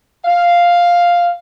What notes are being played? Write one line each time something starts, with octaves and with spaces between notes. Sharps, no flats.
F5